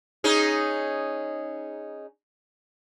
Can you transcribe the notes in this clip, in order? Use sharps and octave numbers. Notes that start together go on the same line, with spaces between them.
C#4 D#4 G#4